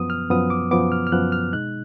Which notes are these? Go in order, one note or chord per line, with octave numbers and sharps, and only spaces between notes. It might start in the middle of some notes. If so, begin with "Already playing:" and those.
Already playing: F#2 F3 B3 D#6
F6
F#2 F3 B3 D#6
D6
F#2 F3 B3 D6
F6
F6
F#2 F3 B3 F#6
F6
B2 G#3 D#4 F#6